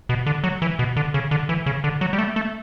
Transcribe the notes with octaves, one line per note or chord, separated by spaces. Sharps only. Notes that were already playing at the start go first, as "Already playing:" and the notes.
B2
D3
F#3
E3
B2
D3
C#3
D3
E3
C#3
D3
F#3
G3
A3
A3